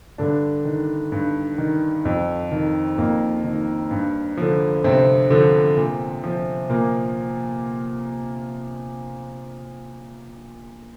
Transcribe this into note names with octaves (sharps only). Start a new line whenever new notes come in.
G2 D3 D4
D#3
G2
D#3
F2
D#3
F2 A#3
D#3
G2
D3 F3
G2 C3 C4
D3 F3
A#2
F3
A#2 A#3